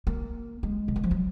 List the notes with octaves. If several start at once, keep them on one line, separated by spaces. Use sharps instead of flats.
A#3
G#3
C#3
D#3
F3
F#3